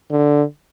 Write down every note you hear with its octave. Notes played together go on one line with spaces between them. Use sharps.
D3